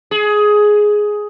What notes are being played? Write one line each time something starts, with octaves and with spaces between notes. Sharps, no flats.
G#4